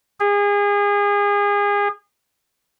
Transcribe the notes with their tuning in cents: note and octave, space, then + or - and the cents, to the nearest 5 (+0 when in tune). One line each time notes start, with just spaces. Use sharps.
G#4 -30